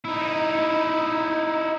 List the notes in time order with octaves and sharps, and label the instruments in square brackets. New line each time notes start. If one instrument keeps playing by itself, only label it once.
[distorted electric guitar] D#4 E4